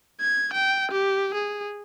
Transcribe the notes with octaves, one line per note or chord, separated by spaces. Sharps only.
G#6
G5
G4
G#4